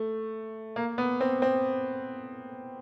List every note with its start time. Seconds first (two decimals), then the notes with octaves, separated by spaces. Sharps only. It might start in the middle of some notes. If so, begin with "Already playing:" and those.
Already playing: A3
0.76 A#3
0.98 B3
1.20 C4
1.42 C4